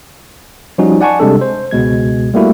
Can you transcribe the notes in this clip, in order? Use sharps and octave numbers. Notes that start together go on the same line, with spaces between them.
F3 G3 C#4 D#4 F#4
D5 F#5 G#5 A5 C#6
C3 G3 G#3 D4 A4
C5
C#2 B2 G#3 G#6
G3 A3 A#3 E4 F#4